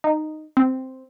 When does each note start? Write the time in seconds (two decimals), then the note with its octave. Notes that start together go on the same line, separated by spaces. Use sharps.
0.04 D#4
0.57 C4